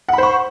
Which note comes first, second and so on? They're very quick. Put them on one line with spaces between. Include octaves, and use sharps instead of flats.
F#5 B5 C5 C#6